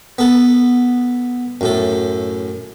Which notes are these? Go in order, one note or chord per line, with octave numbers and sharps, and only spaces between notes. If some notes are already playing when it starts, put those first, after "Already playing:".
B3 A4
F#2 A2 A4